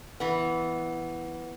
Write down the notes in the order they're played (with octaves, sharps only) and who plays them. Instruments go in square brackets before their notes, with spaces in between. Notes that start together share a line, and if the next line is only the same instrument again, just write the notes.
[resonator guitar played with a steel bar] E3 B3